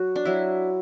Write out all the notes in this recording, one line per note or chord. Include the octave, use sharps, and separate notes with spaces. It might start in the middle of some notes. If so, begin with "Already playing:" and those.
Already playing: F#3 F#4
D4
F#3 E4